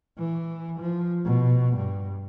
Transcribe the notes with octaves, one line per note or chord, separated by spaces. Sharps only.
E3
F3
B2
G2